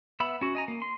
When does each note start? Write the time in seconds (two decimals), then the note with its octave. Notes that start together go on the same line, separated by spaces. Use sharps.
0.20 B3 E5 B5
0.41 C#4 F#4
0.55 D#5 G#5 A#5
0.68 A#3
0.82 C6